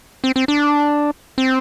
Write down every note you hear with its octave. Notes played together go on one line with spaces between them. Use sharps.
C4
C4
D4
C4